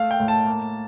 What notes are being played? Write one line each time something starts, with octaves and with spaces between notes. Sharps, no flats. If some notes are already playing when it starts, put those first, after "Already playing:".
Already playing: A3 F5
G5
A2
A5
A#3